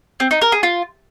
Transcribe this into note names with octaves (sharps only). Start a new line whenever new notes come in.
C4
D#4
A#4
G#4
F4